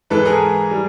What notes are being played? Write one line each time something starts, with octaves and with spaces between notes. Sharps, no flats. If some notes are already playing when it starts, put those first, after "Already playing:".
G#2 E3 G#3 A4 B4
G#4 A#4
G3